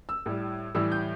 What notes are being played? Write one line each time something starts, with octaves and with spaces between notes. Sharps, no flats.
E6
A2 G3
A2 E3 G3 E6
G6